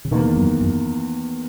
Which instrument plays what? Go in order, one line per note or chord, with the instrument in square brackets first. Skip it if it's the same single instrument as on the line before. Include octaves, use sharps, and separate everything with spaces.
[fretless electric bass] C#3
[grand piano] E2 D#3 A#3 [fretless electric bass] B2
[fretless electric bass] F#2
F#2